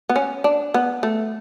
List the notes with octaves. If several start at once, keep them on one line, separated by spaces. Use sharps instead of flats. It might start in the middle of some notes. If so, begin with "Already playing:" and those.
B3
C#4
D4
B3
A3